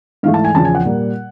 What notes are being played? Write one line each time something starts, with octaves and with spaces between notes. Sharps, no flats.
G#2 E3 A3 F5
A5
G#5
E2 C#3 F3 A5
G#5
F#5
A#2 G3 A#3